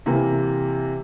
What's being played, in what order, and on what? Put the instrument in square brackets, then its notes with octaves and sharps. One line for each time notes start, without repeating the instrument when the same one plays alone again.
[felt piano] C3 E3 A#3